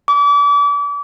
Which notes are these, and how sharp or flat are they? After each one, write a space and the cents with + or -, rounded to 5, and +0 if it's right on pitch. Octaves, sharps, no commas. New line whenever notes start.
D6 -35